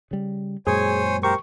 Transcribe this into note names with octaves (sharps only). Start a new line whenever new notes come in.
C#3 G3
F#2 A#2 G#3 G#4 C5 C#5 G#5
G4 A#4 C5 C#6